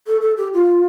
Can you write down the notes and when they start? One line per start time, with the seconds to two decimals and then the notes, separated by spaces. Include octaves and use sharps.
0.07 A4
0.21 A4
0.37 G4
0.53 F4